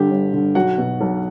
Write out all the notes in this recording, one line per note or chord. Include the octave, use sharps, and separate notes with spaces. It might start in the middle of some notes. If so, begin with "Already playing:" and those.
Already playing: G1 G2 D3 G4
G1
G2 D3
B1 F#4 F#5
B2
B1